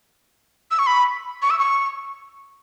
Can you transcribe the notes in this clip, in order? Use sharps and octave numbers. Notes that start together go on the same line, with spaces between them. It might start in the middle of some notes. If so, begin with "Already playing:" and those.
E6
C#6
B5
C#6
E6
C#6